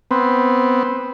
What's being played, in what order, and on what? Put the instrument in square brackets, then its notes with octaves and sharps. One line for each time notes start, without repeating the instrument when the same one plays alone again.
[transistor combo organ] B3 C4